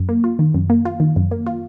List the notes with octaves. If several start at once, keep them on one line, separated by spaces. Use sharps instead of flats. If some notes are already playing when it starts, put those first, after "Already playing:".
Already playing: F#2
A#3
F4
D#3
F#2
A#3
F4
D#3
F#2
A#3
F4